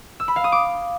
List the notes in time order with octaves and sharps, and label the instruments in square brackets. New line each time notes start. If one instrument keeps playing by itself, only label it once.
[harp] E6
B5
F5
D#6
D6